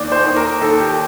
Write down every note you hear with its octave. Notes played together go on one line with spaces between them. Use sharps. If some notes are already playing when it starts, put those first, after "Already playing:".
Already playing: D#2 D5
C5
D#2
A#4
D#2 A4
G4